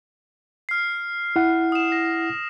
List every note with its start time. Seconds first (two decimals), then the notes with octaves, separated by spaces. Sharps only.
0.69 F6 C7
1.36 E4 F#5
1.72 D#6 E7
1.92 A#6